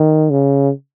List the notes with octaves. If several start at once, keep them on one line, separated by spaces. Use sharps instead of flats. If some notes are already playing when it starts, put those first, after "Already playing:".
Already playing: D#3
C#3